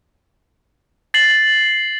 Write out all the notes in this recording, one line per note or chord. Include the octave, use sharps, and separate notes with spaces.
A6 C7 F#7